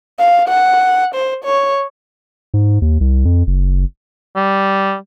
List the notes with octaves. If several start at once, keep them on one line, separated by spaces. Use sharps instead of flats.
F5
F#5
C5
C#5
G#2
D#2
C2
F2
F#1
G3